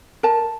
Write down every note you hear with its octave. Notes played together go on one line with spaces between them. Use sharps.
A#4 A5